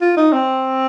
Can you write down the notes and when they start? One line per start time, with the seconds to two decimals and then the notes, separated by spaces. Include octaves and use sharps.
0.01 F4
0.17 D#4
0.33 C4